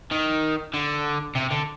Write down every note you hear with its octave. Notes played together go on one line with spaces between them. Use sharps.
D#3
D3
C3
D3